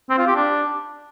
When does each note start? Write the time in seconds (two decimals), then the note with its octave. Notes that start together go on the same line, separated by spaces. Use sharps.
0.10 C4
0.19 F4
0.27 G4
0.36 D4